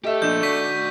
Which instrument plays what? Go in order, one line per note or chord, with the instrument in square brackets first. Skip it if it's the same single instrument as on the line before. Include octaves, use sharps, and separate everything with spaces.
[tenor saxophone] A3 [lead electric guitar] G4 [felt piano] D#5 E5
[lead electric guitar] F3 A#3 [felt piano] D4 D#5 E7 [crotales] G6
[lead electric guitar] F#4 D5 [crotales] C#6 B6